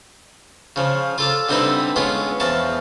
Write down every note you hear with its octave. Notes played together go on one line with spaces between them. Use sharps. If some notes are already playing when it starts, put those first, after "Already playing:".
C#3 F3
F4 A4 D6
D3 G3 C4 D#4 E4 B4
G#3 B3 C#4 F4
E2 F3 A5 C#6